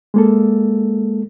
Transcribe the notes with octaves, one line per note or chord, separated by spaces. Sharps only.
G#3 A#3 A4